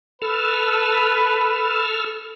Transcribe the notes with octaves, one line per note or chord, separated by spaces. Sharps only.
A4 B4 E6 F6